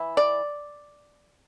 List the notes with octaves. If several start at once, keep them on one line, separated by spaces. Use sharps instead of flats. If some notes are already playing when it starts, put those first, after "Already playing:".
Already playing: E3 E4
D5